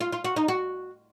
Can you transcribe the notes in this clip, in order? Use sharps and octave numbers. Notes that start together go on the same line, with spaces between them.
F4
F4
F#4
D#4
F#4